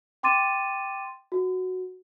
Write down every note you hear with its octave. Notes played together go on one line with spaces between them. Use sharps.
G5 C6 D6 A6 D#7 E7
F#4